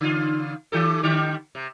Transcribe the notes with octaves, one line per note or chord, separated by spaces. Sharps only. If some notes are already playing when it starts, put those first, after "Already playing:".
C#3 F4
D#3 G4 A4
D3 G3 G4
C3